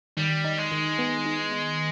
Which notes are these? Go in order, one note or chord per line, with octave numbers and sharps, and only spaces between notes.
D#3 G3
D#4
G#3
D#3
B3
D#4
D#4